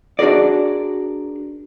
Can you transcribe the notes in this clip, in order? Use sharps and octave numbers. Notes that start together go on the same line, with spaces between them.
D4 F#4 G#4 A#4 D5